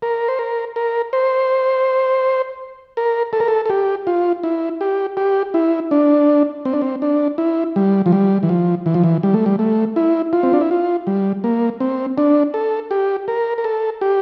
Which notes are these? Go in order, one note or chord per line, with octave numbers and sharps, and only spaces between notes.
A#4
C5
A#4
A#4
C5
A#4
A4
A#4
A4
A4
G4
F4
E4
G4
G4
E4
D4
C4
D4
C4
D4
E4
G3
F3
G3
E3
F3
E3
F3
E3
G3
A3
G3
A3
E4
F4
C4
D4
E4
F4
G3
A#3
C4
D4
A4
G4
A#4
A#4
A4
G4